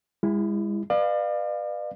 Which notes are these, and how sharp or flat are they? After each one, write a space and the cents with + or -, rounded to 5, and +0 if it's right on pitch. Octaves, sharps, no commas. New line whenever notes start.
G#3 -35 E4 +10
B4 +0 D5 +40 F5 +0